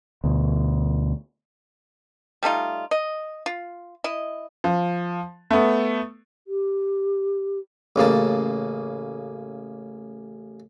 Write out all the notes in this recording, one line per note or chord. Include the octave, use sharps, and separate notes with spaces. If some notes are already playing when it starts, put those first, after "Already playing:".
D2 B2
G3 A3 D#4 F4
D#5
F4
E4 D#5
F3
A3 B3
G4
A1 C#3 A#3 A5